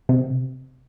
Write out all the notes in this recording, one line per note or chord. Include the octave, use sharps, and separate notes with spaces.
C3